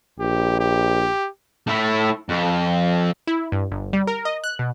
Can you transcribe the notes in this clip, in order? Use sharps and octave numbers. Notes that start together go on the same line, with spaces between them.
A#1 G4
G4
A3 E4
F2
E4
G2
G1
G3
A#4
D#5
F#6
B2